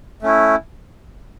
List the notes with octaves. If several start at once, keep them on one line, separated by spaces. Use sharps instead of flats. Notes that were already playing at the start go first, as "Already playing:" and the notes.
A3 C#4 E4